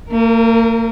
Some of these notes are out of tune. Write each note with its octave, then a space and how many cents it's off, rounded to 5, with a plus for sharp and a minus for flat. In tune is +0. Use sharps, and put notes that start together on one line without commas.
A#3 -40 A#4 +0